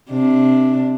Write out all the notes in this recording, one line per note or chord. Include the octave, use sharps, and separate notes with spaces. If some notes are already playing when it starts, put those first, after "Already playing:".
C3 D4